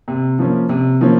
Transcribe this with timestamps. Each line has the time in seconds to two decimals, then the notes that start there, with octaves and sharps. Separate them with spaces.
0.08 C3
0.39 F3 A#3 C#4
0.69 C3
1.01 F3 A#3 C#4